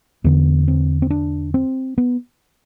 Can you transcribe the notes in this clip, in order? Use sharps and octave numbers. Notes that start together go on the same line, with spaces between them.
E2 D3 B3
C4
C4
D4
C4
B3